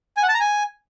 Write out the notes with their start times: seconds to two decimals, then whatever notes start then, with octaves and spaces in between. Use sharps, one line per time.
0.17 G#5
0.23 F#5
0.28 A5
0.34 A#5
0.40 G#5